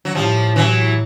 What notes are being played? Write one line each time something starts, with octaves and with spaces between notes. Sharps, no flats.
F#3
A2 F3 G3
E3 F#3